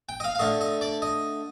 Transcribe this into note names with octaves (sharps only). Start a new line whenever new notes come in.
G5
D#5
F5
F5
D3 A3 D#5
D#5
D5
D#5